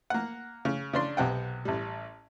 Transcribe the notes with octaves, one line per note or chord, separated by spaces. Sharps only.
A#3 F#5
C#3
C#3 D4 C6
B1 C3 F#5 G5
A1 G3